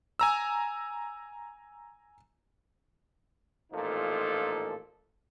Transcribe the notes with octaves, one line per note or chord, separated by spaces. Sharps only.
G#5 A#5 E6
A1 A#2 F3 D#4 A4